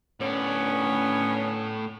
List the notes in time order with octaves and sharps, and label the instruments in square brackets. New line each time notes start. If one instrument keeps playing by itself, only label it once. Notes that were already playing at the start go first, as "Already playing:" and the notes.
[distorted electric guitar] A2 D5 [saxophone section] D3 B3 C#4